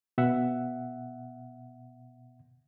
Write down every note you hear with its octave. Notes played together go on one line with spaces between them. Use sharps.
B2 E5 F#5